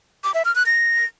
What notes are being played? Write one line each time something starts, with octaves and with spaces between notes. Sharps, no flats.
D6
E5
F6
F#6
A#6